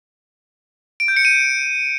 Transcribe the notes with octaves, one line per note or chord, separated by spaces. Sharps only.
D7
G6
C#7
D#7